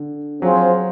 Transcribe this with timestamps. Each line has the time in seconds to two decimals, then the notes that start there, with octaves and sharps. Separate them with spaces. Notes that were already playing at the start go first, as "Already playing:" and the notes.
Already playing: D3
0.42 F#3 C4 F4 G#4 C5